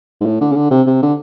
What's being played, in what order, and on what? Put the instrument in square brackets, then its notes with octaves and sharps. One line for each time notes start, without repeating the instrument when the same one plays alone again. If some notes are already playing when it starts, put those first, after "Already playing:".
[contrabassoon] G#2
A2
D3
C#3
D3
C3
C3
D3